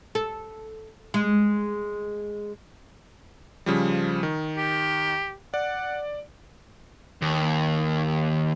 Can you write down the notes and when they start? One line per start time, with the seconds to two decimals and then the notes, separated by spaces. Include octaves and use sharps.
0.15 A4
1.14 G#3
3.66 C#3 F3 G3
4.23 D#3
4.57 G4
5.54 D5 F#5
7.22 D#2